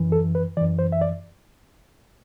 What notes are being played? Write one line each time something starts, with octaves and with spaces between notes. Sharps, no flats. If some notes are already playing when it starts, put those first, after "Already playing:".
Already playing: F#2 E3
A4
B4
F#2 E3 D5
C5
E5
D5